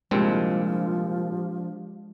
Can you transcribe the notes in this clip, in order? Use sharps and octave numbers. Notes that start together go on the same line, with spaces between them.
C2 A#2 F3 G#3 C4 D4 G4